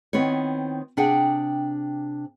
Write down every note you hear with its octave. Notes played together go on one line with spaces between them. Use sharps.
D#3 B3 C4 E4 C#5
C3 D4 G#4 F#5 G5